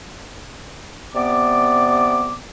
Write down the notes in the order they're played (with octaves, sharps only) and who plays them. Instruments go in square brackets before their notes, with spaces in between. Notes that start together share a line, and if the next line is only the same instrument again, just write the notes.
[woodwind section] C3 B3 D5 D6